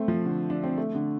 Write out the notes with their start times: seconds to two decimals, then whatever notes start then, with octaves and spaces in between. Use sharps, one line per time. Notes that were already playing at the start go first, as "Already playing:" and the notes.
Already playing: A3 C4
0.08 F3
0.26 D3
0.50 D4
0.64 C4
0.77 A3
0.95 D3